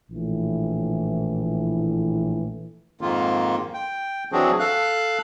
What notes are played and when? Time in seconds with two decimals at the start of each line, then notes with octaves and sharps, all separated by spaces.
0.11 A#1 A2 E3
3.01 F2 G#2 D#3 A#3 F4
3.74 G5
4.32 E3 F#3 C4 D4 F#4 G#4
4.60 A4 F5 F#6